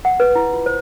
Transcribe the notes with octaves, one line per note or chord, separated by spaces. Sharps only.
F#5
B4
E4
F4
C5